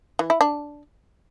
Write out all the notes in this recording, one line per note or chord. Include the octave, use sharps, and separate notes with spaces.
E3
E4
D4